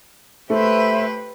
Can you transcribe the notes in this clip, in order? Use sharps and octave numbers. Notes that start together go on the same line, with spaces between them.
A3 G4 B4 C5 E5 B5